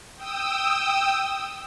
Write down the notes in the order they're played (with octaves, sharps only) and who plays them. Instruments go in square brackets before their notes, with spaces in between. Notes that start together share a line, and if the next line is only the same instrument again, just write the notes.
[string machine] G5 D#6 E6